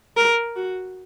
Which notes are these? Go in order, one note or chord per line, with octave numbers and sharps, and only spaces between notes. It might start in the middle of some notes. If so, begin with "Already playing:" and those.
A#4
F#4